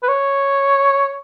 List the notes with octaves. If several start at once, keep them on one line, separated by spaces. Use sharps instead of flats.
B4
C#5